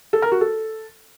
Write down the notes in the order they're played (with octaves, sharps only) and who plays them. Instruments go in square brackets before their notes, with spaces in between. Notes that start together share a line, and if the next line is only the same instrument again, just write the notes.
[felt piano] A4
A#4
F#4
A4